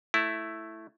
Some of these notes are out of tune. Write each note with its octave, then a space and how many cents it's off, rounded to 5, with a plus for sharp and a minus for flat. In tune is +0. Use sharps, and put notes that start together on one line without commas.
A3 +0 E4 +0